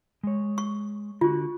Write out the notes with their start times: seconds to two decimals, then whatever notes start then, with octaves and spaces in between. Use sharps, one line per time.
0.23 G#3 C#5
0.58 C#6
1.21 D3 F4 F#4